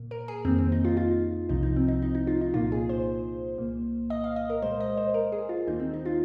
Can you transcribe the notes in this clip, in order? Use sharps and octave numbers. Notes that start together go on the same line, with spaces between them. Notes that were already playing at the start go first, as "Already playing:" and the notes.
Already playing: A#2 A#3
A#4
G#4
F2 D#3 A#3 C4
C4
D#4
F4
F4
C2 C3 F3 D#4
D#4
C4
D#4
D#4
D#4
F4
D#4
C2 A#2 A#3 F4
G#4
C5
C2 A#2 A#3
D#5
F5
D#5
A#4
A#2 G#3 C5
D#5
C5
A#4
G#4
F4
D#2 D#3 A#3 D#4
C4
D#4
F4